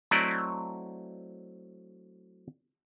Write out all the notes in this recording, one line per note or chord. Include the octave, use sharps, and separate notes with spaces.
F#3 A3 C4 E4 D5 D#5